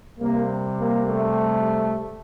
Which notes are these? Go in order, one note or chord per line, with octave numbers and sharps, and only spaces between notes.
C3 G3 A#3
A#3
A3